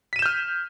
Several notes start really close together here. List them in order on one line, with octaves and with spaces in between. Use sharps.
B6 D#7 E7 G6 F6